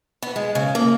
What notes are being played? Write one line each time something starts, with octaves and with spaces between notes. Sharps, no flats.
B3
G#3
C#3
A#3